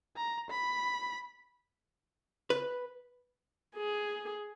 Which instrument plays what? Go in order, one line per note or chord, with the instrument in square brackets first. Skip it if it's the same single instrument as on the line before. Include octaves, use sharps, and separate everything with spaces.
[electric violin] A#5
B5
[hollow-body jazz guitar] B4
[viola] G#4